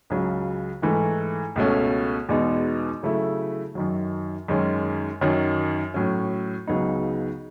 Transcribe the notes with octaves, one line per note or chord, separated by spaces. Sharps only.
C#2 C#3 F#3
G#2 E3 A3
C#2 B2 A3 C#4
E2 B2 G#3 B3 D#4
C#3 F#3 A3 E4
F#2 D#3 F#3
F#2 D#3 G#3 C#4
F#2 D#3 F#3 C#4
A2 F#3 C#4
C#2 C#3 F#3 B3 D#4